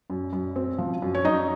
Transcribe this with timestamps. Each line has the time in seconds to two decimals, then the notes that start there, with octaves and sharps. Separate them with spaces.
0.10 F#2
0.33 F#2
0.56 C4
0.78 F3
1.02 F#2
1.15 C#5
1.25 F#2 D#4 D#5